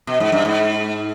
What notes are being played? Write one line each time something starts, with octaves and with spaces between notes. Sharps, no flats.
B2
G#2
G2
G#2